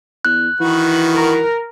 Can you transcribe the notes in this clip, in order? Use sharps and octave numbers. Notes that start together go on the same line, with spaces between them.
E2 F#6
D#3 E3 F#4 B4
A#4